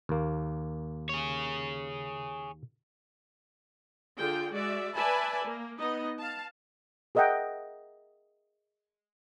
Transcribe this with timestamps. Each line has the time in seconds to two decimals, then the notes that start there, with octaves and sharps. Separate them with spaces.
0.09 D#2 A#3
1.09 G#4 C#5
4.16 D3 F4 G#4 G5
4.52 G#3 F#4 D5 E5
4.93 B4 D5 E5 G#5 A5 B5
5.45 A#3
5.79 B3 D#4 D#5
6.19 F5 A5
7.15 G#4 A#4 D#5 E5 F#5 G5